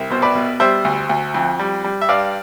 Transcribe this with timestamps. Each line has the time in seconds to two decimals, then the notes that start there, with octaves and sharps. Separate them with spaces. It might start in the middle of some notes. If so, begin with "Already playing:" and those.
Already playing: C2
0.10 B2 C5
0.22 B4 D5
0.35 B2
0.60 G3 C5 E5
0.85 D2
1.09 D2
1.34 F2
1.59 G3
1.84 G3
2.01 E5
2.09 G2 D5 F5